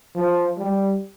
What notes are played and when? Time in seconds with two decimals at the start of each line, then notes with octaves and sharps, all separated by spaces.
0.15 F3
0.58 G3